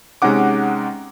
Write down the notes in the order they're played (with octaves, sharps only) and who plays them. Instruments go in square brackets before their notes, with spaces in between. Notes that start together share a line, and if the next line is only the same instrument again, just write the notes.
[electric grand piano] C3 G#3 C#4 D#4 F#5 D6